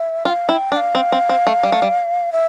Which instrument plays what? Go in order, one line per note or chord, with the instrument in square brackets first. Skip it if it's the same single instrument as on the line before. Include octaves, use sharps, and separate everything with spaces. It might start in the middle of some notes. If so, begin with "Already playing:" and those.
Already playing: [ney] E5
[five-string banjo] F4 [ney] G5
[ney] F5
[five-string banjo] E4 [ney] G5
[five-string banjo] D4 [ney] G5
[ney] F5
[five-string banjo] C4
C4
C4
A3
G3
A3
G3
[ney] E5